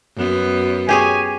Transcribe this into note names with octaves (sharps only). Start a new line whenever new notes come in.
F#2 B3
G4 G#4 C#5 G#5